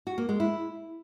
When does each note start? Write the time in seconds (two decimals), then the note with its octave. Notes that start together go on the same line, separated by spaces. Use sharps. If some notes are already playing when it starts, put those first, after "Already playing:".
0.07 F#4
0.18 A#3
0.29 G#3
0.40 E4